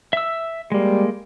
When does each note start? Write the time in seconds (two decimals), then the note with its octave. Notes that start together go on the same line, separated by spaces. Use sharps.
0.13 E5 E6
0.72 G3 G#3 A#3